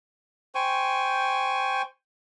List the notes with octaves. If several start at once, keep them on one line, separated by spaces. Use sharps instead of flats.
C5 G5 G#5 C#6